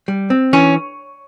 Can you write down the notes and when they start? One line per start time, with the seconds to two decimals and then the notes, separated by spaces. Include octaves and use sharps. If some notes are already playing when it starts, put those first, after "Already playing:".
0.08 G3
0.30 C4
0.53 E3 C#4